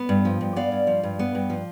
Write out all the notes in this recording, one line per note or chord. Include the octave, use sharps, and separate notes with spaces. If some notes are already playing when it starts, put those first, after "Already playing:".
Already playing: B3
G2
F3
G2
B3 D5 F5
G2
F3
G2
B3
G2
F3